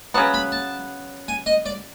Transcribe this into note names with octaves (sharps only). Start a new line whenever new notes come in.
C#3 F#3 B3 A5
B5
A5
G#5
D#5
D5